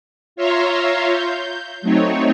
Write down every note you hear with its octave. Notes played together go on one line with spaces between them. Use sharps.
F4 C#5 E5 F5 A#5 C6
G6
F#3 A3 C4 D#4 C#5